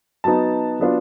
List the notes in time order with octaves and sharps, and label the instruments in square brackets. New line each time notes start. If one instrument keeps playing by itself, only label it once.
[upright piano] F#3 B3 D#4 A5
F#3 B3 D4 F4